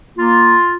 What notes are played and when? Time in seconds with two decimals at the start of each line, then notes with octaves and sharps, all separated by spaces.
0.17 A#3 F4